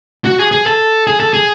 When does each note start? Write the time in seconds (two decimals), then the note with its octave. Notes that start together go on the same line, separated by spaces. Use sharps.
0.25 F#4
0.39 G#4
0.52 G#4
0.66 A4
1.07 G#4
1.20 A4
1.33 G#4